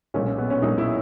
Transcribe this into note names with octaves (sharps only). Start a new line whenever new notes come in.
B1 A#2 C#4
C#4
B3
C#4
B1 A#2 D#4
E4